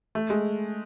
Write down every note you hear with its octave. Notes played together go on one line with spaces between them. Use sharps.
A3
G#3